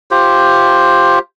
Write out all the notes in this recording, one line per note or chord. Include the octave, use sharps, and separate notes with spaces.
F4 G4 C5